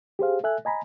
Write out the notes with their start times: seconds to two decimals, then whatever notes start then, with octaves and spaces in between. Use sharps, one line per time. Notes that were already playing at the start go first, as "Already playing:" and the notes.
0.19 G4 G#4 C5 F5
0.44 A4 E5 G#5 F#6
0.65 D#5 G#5 A#5 B5